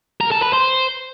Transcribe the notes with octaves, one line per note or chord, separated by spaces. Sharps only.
A#4
A4
B4
C5